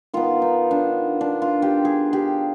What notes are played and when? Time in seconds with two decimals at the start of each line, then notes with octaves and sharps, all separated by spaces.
0.14 D#3 B3 F4
0.42 D#4
0.71 D4
1.21 D4
1.42 F4
1.62 G4
1.85 G#4
2.13 G4